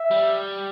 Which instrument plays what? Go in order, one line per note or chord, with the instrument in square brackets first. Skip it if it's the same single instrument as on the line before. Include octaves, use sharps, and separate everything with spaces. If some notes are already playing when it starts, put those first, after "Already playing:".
Already playing: [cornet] E5
[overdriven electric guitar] G3